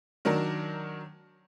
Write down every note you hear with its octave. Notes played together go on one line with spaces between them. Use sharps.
D#3 F#3 D4 A#4